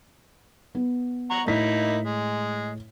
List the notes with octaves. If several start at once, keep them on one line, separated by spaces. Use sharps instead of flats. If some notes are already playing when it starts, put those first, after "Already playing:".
B3
F#5 A#5 C#6
A2 A#3 D#4 E4 B6
G#3